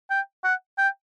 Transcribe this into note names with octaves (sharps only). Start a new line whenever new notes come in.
G5
F#5
G5